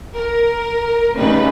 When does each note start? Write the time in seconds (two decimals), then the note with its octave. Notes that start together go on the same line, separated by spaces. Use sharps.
0.15 A#4
1.15 C#3 G3 A3 D#4 B4